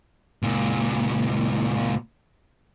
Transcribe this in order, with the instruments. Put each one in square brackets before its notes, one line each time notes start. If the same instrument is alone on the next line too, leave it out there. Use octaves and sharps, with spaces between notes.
[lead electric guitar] C#2 A#2